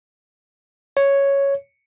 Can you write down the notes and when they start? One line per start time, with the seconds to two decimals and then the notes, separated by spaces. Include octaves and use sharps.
0.97 C#5